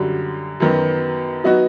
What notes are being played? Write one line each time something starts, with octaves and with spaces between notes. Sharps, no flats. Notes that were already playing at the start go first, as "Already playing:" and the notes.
Already playing: F#2 D3 G3
F#2 D#3 F#3 B3
F#3 B3 D#4 F#4